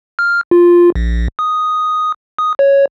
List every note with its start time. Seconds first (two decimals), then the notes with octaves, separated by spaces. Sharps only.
0.19 F6
0.51 F4
0.95 A#1
1.39 D#6
2.39 D#6
2.59 C#5